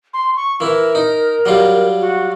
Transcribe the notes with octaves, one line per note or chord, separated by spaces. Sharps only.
C6
C#6
E3 E4 A#4
D#4
F#3 G3 F4
F#4